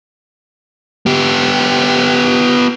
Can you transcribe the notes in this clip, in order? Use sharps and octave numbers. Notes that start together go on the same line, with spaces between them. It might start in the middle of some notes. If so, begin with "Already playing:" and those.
B3 G4